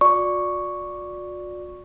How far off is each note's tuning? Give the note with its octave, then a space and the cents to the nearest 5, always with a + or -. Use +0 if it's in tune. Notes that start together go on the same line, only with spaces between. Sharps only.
F#4 -45 D5 +0 C#6 +0